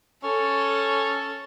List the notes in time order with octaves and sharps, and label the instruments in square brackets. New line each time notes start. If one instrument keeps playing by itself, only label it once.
[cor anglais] C#4 [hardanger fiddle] A4